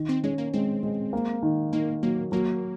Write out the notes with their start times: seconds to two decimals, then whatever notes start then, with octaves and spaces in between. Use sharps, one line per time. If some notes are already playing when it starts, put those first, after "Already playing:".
Already playing: D#3
0.09 C4
0.24 G#3 C#4
0.38 A#3
0.53 G#3 C4
0.83 G#3
1.13 A#3
1.43 D#3
1.73 D#3 A#3
2.03 F#3 A#3
2.32 F#3 A#3